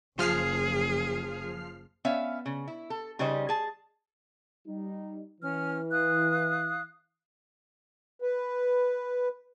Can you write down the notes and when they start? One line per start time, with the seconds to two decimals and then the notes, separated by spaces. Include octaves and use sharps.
0.19 F#1 F3 G#4 F6 C7
2.05 B3 C#4 E5 F5
2.46 C#3
2.67 E4
2.90 A4
3.19 C#3 G3 C#4 D#4 C5 D#5
3.49 G#4 A5
4.67 G3 D#4
5.41 E3 C#4 F6
5.91 F5 D#6 F#6
8.22 B4